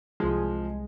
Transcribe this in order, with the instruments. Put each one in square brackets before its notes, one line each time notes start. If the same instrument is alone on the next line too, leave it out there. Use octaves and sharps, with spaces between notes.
[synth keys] C2 G#3 [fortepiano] F3